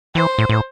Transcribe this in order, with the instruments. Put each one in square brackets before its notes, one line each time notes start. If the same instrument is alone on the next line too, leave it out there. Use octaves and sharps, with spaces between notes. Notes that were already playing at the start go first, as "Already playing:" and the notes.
[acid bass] E3 [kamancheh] C5
[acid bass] A2
A2